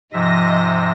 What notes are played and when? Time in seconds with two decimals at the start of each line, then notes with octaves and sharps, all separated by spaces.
0.13 G#2 C3 F3 D#5 E5 A#6